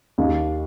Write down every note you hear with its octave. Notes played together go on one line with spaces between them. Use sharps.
D#2